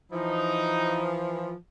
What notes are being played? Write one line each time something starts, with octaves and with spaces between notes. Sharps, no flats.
E3 F3 D#4